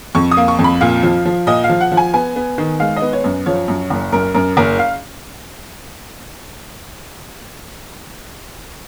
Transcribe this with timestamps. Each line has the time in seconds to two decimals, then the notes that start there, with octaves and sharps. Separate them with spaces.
0.15 F2 C#6
0.31 D#6
0.37 A#3
0.48 C#6
0.59 F2
0.64 B5
0.81 A#2 F5
1.03 F3
1.25 F3
1.47 A#2 D#5
1.64 F5
1.69 F3
1.81 F#5
1.92 F3
1.97 G#5
2.14 B3 G#5
2.36 B3
2.58 D#3
2.80 G#3 F5
2.96 D#5
3.02 B3
3.13 C#5
3.24 F#2
3.46 F3 C#5
3.68 F#2
3.90 F#1
4.12 F#2 A#4
4.35 F#2 A#4
4.57 F#1 A#4
4.79 F5